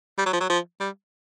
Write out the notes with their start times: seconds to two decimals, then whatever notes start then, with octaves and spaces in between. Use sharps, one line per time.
0.18 G3
0.26 F#3
0.33 F3
0.40 F#3
0.50 F3
0.80 G3